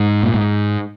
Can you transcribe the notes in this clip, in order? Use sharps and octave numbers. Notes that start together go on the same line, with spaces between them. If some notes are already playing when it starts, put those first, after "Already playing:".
Already playing: G#2
A#2
G#2